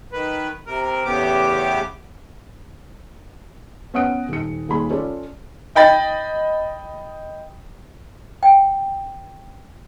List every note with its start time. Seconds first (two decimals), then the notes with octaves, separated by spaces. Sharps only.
0.12 D#3 B4
0.67 C3 A#4
1.05 E2 A2 C#3 B3 G4 D6
3.94 B3 C#4 F#5 D#6 D7
4.29 D#1 C#7
4.69 D#1 A#2 F4 G#4 B5
4.90 C#4 F4 A4 D5
5.75 D#5 G5 B5 A6
8.43 G5